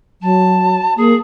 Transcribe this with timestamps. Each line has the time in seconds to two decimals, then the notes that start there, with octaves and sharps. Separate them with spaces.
0.22 F#3 A5
0.97 A#3 G#4